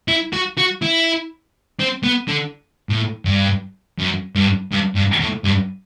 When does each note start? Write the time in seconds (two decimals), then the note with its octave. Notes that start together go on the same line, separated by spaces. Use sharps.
0.08 E4
0.33 F#4
0.57 F#4
0.82 E4
1.80 C4
2.04 B3
2.28 D3
2.89 A2
3.25 G2
3.98 F#2
4.35 G2
4.72 G2
4.96 G2
5.21 A2
5.45 G2